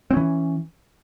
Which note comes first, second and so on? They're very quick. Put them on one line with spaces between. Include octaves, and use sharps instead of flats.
C4 C#4 E3